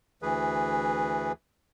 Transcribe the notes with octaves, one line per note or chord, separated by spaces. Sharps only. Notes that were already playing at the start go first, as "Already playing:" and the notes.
D2 E3 G#4 B4